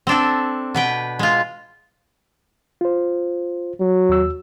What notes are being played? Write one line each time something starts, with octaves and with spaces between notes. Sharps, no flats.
C4 D4 A4
B2 B4 G5
G#3 F4
F4 C5
F#3
D#2 E6